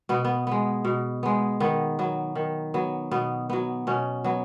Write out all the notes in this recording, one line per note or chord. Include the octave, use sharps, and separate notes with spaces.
B2 B3
B3
G#3 B3
B2
G#3 B3
D#3 B3
F#3 B3
D#3
F#3 B3
B2 B3
F#3 B3
B2 C#4
F#3 B3